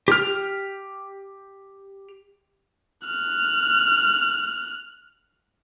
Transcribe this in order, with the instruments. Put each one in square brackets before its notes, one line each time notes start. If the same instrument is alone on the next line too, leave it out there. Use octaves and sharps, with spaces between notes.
[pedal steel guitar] G4 F6
[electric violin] F6 F#6